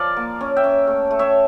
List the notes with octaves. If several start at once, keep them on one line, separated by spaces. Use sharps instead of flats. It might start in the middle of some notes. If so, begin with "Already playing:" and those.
Already playing: F3 F4 A#4 D5 F5
A#3
C#4
E5 G5
C#4
A3
A3
C#5 E5